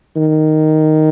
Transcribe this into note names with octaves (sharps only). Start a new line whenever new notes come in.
D#3